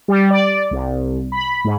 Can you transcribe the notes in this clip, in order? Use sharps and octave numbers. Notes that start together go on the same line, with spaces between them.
G3
D5
C2
B5
G#2